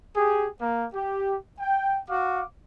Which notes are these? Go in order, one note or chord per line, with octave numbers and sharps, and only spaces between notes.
G4 G#4
A#3
G4
G5
F#4 F5 D6